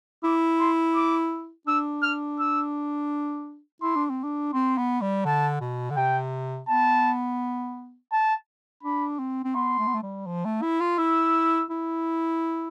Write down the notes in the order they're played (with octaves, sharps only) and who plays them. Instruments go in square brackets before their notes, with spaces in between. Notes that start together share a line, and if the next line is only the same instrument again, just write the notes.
[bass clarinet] E4 [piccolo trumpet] D6
[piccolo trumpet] C6
D6
[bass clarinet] D4 [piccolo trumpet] E6
[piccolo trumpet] F6
E6
[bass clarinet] E4 [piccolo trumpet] C6
[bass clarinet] D4
C4
D4
[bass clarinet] C4 [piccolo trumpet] C6
[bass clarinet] B3
G3
[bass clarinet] D3 [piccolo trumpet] A5
[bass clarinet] B2
D3
[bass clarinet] C3 [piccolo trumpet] G5
[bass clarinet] B3 [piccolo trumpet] A5
[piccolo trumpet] A5
[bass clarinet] D4 [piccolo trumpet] B5
[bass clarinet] C4
C4
[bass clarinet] B3 [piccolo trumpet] C6
[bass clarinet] A3
B3
A3
G3
F3
A3
E4
F4
[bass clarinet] E4 [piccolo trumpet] E6
[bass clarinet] E4